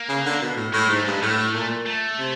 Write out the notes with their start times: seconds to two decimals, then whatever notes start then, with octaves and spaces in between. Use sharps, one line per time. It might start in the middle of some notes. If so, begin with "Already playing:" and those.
Already playing: A#3
0.09 C#3
0.26 D3
0.42 B2
0.57 A2
0.73 A2 G#3
0.89 G#2 A3
1.05 G2 G#3
1.22 A2 A3
1.54 A#2
1.86 A3
2.19 C3